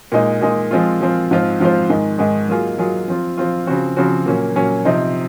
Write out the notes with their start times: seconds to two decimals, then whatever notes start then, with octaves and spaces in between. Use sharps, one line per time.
0.12 A#2 G#3 D#4
0.41 A#2 G#3 D#4
0.71 F3 G#3 C4 F4
1.01 F3 G#3 C4 F4
1.31 G#2 F3 C4 F4 C5
1.60 G#2 F3 C4 F4 C5
1.90 G#2 D#3 G#3
2.18 G#2 D#3 G#3
2.49 F#3 A#3 F4 G#4
2.78 F#3 A#3 F4 G#4
3.08 F3 C4 F4
3.37 F3 C4 F4
3.67 C#3 F3 C4 F#4
3.96 C#3 F3 C4 F#4
4.26 A#2 F#3 A#3 C#4
4.56 A#2 F#3 A#3 C#4
4.85 C3 F3 C4 D#4